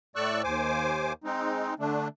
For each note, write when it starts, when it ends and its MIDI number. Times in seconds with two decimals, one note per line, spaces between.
0.16 0.42 45
0.16 0.42 57
0.16 0.42 74
0.16 0.42 85
0.16 0.42 88
0.16 0.42 90
0.44 1.13 39
0.44 1.13 72
0.44 1.13 80
0.44 1.13 86
1.24 1.74 56
1.24 1.74 60
1.24 1.74 63
1.80 2.08 50
1.80 2.08 57
1.80 2.08 62